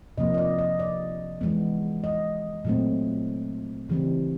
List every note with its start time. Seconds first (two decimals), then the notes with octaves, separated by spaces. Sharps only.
0.18 C3 F3 A#3 D#5
0.34 D#5
0.38 D5
0.58 D#5
0.79 D5
1.41 E3 G#3 B3
2.04 D#5
2.65 A#2 F#3 A3 C4
3.89 C#3 E3 G3 C4